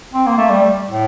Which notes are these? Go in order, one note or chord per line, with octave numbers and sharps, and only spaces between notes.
C4
A#3
A3
G3
A2